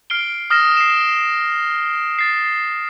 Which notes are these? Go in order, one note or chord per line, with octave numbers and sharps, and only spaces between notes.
F6 C7 D7 G7
D#6 F6 A#6 E7
C7 E7
A6 C7